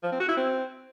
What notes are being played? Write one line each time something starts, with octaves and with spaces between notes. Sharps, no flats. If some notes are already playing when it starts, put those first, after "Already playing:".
F3
C4
F#4
E4
C4